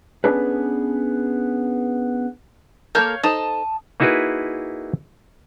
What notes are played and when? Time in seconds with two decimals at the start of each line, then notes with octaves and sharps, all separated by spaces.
0.24 B3 C#4 D4 G#4 A4 B4
2.95 A#3 A4 A#4 C#5 F5 G6
3.23 D#4 A4 C5 A5 D#6
4.00 A#3 D#4 E4 F#4 G#4 B4